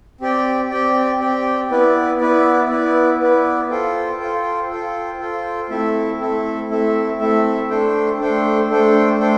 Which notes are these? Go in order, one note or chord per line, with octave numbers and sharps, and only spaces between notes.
C4 G4 D5 G5
C4 G4 D5 G5
C4 G4 D5 G5
B3 E4 B4 D5
B3 E4 B4 D5
B3 E4 B4 D5
B3 E4 B4 D5
F4 A4 C5 G5
F4 A4 C5 G5
F4 A4 C5 G5
F4 A4 C5 G5
A3 C4 E4 A4 E5
A3 C4 E4 A4 E5
A3 C4 E4 A4 E5
A3 C4 E4 A4 E5
A3 D4 A4 C5 G5
A3 D4 A4 C5 G5
A3 D4 A4 C5 G5
A3 D4 A4 C5 G5